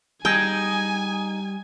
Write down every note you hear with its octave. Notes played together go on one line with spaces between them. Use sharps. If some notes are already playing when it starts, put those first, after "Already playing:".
G3 D#4 G#4 G5 G#5